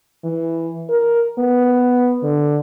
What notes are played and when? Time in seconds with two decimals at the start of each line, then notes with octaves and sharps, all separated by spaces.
0.24 E3
0.90 A#4
1.39 B3
2.23 D3